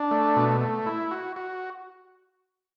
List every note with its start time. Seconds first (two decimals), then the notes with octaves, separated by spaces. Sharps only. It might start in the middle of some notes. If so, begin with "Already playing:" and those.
Already playing: D4
0.11 A3
0.36 B2
0.61 A3
0.86 E4
1.11 F#4
1.36 F#4